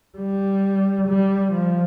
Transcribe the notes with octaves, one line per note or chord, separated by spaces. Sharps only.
G3
G3
F3